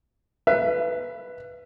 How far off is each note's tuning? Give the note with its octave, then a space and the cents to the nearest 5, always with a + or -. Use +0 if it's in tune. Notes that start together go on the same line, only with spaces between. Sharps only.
B4 +0 E5 +40